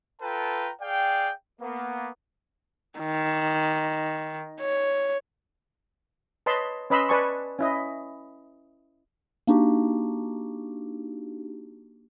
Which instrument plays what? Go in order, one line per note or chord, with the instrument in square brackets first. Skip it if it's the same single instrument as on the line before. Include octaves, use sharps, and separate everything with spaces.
[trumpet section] F4 A4 B4 G5 A5 A#5
G#4 D5 F5 G5
A#3 B3
[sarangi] D#3
C#5
[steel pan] B4 C#5 D#5 A5 B5 C6
C#4 B4 D#5 B5 C6 E6
B4 D5 G#5 A5 C#6
C#4 E4 D#5
[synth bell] A#3 D4 D#4 F#4 G4